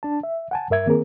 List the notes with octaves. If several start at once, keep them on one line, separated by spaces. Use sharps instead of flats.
D4 A5
E5
F#5 G#5 A5
G2 A#4 E5 G#6
D#3 A#3 C4 G#4 A#4